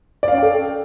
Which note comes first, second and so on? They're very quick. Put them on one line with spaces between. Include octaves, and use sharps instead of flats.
D5 F5 C#4 G5 A4